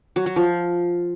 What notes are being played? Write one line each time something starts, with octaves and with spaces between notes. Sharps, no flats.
F#3
F#3
F3